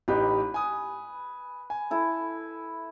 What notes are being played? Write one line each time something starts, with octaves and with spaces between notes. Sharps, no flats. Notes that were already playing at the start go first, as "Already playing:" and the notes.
A1 D#4 G4 B4
G#5 D#6
G#5
E4 A4